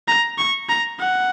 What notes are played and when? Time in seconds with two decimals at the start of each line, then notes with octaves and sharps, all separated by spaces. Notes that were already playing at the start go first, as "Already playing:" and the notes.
0.08 A#5
0.38 C#6
0.69 A#5
1.00 F#5